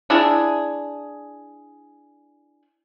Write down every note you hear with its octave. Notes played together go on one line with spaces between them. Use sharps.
D4 E4 G#4